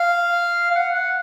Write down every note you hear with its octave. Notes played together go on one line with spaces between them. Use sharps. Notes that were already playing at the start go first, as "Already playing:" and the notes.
Already playing: F5
F5
F#5
F#5